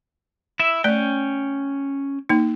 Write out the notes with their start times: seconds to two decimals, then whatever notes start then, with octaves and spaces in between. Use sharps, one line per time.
0.60 E4 E5
0.84 A3 C#4 D5 G5
2.29 A#3 D#4